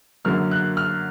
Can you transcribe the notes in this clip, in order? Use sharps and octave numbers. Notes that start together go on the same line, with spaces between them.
F#2 D3 F#3 A#3 F6
F#6
F6